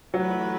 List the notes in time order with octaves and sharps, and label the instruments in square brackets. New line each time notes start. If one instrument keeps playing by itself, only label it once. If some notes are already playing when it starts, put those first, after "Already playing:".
[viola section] E3 A3 E4 B4 [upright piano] F#3